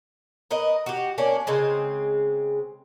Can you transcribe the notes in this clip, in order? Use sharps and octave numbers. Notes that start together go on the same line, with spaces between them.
A#4 B4 D#5
F#4 G4
A#3 C#4 D4
C#3 G#3 C4